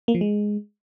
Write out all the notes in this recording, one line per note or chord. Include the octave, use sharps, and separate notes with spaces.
A#3
F3
G#3